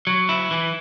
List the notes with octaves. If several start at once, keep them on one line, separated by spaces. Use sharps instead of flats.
F#3
E4
E3